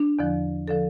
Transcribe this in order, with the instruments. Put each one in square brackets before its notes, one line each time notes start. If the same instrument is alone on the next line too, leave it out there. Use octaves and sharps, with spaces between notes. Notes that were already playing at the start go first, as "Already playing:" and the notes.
Already playing: [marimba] D4
E2 D3 F3
D3 F3 A4